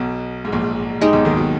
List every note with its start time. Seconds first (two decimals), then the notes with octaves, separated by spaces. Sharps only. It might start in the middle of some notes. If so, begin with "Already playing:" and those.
Already playing: B1 B2
0.45 G#2
0.52 A#1 A#2
1.01 G#2 G#3 D#4 G4
1.13 B1 B2
1.25 D#2 D#3
1.37 B2